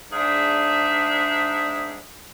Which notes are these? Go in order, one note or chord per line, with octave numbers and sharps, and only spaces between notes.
G#2 D4 G#4 D5 E5